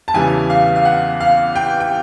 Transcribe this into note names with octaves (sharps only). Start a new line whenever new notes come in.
A5
E2 C#3 E3 G3 G#5
F5
F5
F#5
F5
G5
G5